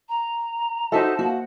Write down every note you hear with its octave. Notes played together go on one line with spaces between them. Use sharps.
A#5
D#4 F#4 A4 C5 D#5 E5 A5
A#3 F#4